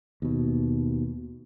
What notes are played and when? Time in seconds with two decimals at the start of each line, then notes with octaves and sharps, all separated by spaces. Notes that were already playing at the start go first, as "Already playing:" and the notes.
0.22 D#2 B2